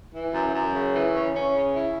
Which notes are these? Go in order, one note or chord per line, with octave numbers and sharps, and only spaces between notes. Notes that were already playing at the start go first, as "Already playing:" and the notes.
E3
F#2
F#2
C#3
E3
C#4
C#4
C#3
E4